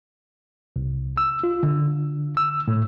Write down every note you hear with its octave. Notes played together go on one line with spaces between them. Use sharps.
C2
E6
F4
D3
E6
A2